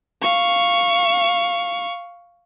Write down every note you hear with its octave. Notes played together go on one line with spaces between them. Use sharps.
F5 C#6